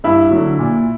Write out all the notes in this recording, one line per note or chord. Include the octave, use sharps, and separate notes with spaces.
G2 E4
D3 F#3
A#2